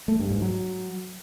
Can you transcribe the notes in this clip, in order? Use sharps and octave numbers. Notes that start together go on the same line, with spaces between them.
A3
G2
G#2
F#3